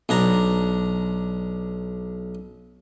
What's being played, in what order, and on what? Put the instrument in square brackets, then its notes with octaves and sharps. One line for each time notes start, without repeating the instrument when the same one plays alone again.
[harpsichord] B1 D4 A#5